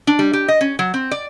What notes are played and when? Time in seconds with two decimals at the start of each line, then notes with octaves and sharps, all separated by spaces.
0.07 D4
0.19 G3
0.33 G4
0.48 D#5
0.61 C#4
0.79 F#3
0.94 C4
1.11 D5